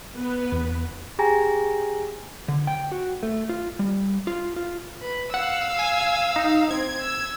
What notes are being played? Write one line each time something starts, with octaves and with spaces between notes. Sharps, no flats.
B3 B4
E2
G4 G#4 G5 G#5 A#5 A#6
D3
G5
F#4
A3
F4
G3
F4
F4
B4
F5 F#5 E6
G#5
D#4
C4 G#6
E6